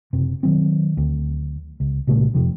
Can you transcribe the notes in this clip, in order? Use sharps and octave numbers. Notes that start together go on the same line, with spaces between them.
F#1 C3
D#3 F#3 C4
D2
C#2
C2 A#2 C#3 A3
F1 C3 F3